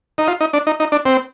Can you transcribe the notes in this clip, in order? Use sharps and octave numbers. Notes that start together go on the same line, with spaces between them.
D#4
F4
D#4
D4
D#4
D#4
D4
C4